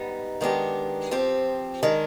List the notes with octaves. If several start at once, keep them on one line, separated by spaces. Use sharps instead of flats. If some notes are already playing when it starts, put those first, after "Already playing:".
Already playing: G#2 G3 B3 D#4
D#3 G#3 B3 D4 G4
F3 C4 G4
D#3 G#3 D4